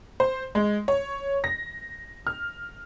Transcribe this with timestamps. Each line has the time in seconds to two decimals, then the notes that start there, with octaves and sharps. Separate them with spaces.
0.20 C5
0.55 G#3
0.88 C#5
1.44 A#6
2.27 F6